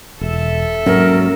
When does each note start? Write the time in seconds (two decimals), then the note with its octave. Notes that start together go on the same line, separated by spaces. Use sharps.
0.21 E1 A4 E5
0.86 G#2 F#3 A#3 C#4 A#4